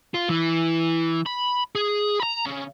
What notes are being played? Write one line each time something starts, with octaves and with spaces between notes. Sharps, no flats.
F4
E3
B5
G#4
A#5 B5
C#3